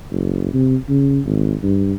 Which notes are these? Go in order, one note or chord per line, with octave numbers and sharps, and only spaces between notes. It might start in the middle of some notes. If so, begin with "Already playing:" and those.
F#1
C3
C#3
G#1
G2